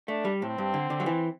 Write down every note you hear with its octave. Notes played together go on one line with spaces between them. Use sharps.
A3 D4
G3
A2 C4
G2
D3
D3
F#3
E3